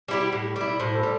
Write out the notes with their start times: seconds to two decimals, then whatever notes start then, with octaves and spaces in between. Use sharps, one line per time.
0.08 G3 E4 G4
0.32 A2
0.56 G3 E4
0.80 A2 C5
0.95 A4
1.03 G3